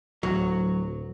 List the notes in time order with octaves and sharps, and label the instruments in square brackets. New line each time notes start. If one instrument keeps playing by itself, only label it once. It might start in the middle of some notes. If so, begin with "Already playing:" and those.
[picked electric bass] D1 [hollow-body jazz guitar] F#3